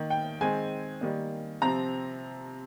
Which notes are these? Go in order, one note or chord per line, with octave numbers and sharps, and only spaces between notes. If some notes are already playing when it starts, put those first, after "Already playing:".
Already playing: D#3 A#3
G5
D#3 G#3 C4 G#5
D#3 G3 A#3
C3 F3 C4 A#5